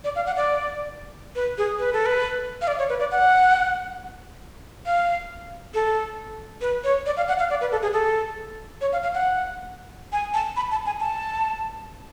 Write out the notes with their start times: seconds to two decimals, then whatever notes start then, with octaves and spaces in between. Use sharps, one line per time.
0.04 D5
0.16 F5
0.26 F#5
0.37 D5
1.36 B4
1.58 G#4
1.79 B4
1.93 A4
2.06 B4
2.61 F5
2.67 D5
2.79 C#5
2.89 B4
3.00 D5
3.11 F#5
4.86 F5
5.74 A4
6.61 B4
6.84 C#5
7.06 D5
7.17 F5
7.28 F#5
7.39 F5
7.50 D5
7.61 B4
7.72 A4
7.82 G#4
7.93 A4
8.81 C#5
8.93 F5
9.03 F5
9.14 F#5
10.12 G#5
10.34 A5
10.56 B5
10.71 A5
10.86 G#5
11.00 A5